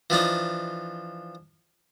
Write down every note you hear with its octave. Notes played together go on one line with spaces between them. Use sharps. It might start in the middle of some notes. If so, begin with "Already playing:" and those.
E3 F3 D4 D#4